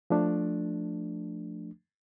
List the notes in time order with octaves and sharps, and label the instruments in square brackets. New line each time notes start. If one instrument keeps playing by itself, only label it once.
[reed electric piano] F3 A3 D4